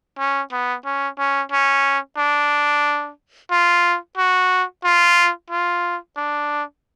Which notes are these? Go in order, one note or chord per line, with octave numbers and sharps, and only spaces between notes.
C#4
B3
C#4
C#4
C#4
D4
F4
F#4
F4
F4
D4